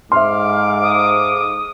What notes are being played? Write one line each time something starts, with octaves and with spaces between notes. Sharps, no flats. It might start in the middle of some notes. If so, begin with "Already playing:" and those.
G#2 A4 E5 F5 C6 D6 F6
D#6